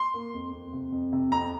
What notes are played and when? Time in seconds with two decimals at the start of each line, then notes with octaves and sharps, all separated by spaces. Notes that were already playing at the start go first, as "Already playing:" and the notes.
Already playing: C6
0.14 A#3
0.34 F2
0.53 F2
0.73 C3
0.92 F2
1.13 C3
1.32 F2 A#5